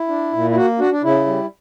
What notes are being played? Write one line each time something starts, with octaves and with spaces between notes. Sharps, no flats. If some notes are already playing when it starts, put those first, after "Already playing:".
Already playing: E4
D4
A#2
E4
A#3 F#4
D4 F#4
D4
C#3 E4
G3